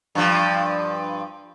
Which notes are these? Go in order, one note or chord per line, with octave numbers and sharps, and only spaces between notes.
G2 F3